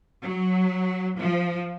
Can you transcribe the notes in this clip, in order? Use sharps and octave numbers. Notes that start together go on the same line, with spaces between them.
F#3
F3